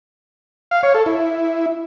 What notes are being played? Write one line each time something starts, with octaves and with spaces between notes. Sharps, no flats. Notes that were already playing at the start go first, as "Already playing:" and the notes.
F5
C#5
A4
E4